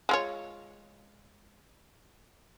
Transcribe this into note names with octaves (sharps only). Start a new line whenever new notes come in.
G#3 F4 C#5